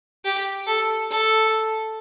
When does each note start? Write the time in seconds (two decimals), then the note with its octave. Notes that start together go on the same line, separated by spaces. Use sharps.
0.25 G4
0.67 A4
1.11 A4